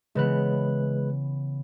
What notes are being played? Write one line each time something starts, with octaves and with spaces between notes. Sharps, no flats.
C#3 E3 G#3 B3 B4 F#6